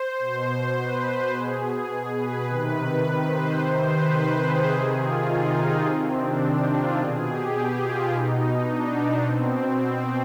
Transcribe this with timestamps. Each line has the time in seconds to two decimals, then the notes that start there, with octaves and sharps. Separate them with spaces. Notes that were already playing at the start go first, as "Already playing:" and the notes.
Already playing: C5
0.19 B2
0.76 B4
1.33 B2 G#4
1.61 G#4
2.17 B4
2.45 C3 D#3
2.73 B4
3.31 C5
3.58 C3 D#3 C5
3.87 B4
4.44 G#4
4.71 C3 D#3 G#4
5.00 F4
5.29 D#4
5.84 C3 D#3 C4
6.13 D4
6.69 F4
6.98 B2 G#4
7.26 G4
7.83 F4
8.10 B2 D#4
8.68 D4
9.24 B2 C4
9.80 C4